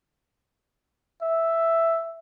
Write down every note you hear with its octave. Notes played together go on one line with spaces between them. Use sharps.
E5